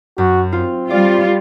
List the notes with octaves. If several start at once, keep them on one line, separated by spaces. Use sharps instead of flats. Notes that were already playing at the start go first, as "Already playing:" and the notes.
F#2 F#4
C4 F4
G3 F4 D5 F5